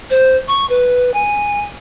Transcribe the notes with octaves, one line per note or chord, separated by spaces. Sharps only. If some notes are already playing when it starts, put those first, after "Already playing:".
C5
C#6
B4
G#5